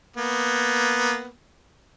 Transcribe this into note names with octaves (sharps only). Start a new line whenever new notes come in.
A#3 B3